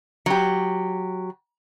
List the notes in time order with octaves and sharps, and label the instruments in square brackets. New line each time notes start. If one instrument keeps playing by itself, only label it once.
[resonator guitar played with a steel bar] F#3 G4